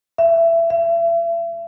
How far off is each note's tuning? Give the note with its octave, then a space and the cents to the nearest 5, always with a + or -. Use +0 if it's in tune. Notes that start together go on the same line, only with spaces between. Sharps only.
E5 +25
E5 +40